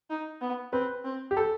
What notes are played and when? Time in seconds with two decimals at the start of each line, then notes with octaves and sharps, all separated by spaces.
0.10 D#4
0.41 B3
0.73 C4 B4
1.04 C4
1.31 G4
1.37 A4